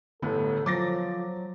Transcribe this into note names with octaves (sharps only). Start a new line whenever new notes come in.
G1 A2 D3 B3 A4
F3 F#3 D6 A6 A#6